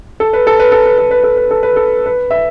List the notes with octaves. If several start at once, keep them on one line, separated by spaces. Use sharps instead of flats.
A4
B4
A4
B4
A4
B4
A4
B4
A4
B4
A4
B4
A4
B4
E5